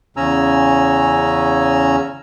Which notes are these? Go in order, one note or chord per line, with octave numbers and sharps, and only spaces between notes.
E2 C#3 C#4 G#5 A#5 E6